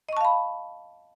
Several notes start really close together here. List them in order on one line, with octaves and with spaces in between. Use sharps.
D#5 C#6 A5 F5 B5